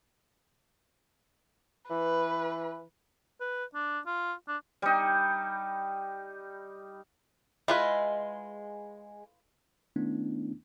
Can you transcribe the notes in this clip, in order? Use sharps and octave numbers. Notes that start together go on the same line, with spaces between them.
E3 B4
B4
D4
F4
D4
G3 D#4
G#3 E4 F4 B4
D#3 A3 B3 C#4 D4 E4